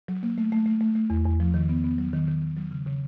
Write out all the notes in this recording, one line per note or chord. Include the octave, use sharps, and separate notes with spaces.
F#3
A#3
A3
A3
A3
A3
A3
E2
E2
F3
D#3
B3
B3
F#3
D#3
D#3
D#3
F#3
C#3
C#3